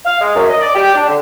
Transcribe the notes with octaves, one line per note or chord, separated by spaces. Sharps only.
F5
G#3
F#2
D#5
D5
G4
D4
D3